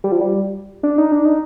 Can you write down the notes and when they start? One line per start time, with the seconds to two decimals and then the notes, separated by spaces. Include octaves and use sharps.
0.04 G3
0.12 F3
0.21 G3
0.83 D4
0.98 D#4
1.12 D4
1.25 D#4